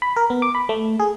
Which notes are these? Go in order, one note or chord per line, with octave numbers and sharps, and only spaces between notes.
B5
A#4
B3
D6
B5
A3
G#4